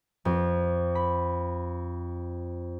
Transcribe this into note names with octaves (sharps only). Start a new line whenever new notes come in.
F2
B5